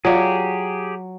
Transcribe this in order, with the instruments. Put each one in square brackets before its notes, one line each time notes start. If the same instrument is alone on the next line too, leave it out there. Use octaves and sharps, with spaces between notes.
[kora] F#3 [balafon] F4 D5 F5 [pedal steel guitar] G4 G#4